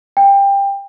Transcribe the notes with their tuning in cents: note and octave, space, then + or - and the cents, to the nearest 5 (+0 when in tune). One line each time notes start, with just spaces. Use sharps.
G5 +20